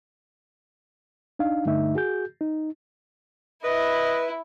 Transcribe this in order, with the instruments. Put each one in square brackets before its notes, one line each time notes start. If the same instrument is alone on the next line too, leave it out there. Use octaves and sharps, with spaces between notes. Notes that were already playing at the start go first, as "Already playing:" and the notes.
[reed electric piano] D4 D#4 F5
G2 D3 A3 D#4 E5
F#4 G#4 G6
D#4
[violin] E4 [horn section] B4 [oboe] D#5